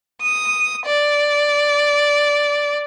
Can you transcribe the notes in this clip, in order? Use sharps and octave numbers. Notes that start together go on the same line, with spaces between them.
D#6
D5